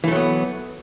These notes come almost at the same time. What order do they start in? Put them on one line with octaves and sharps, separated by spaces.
E3 A3 F#3 B3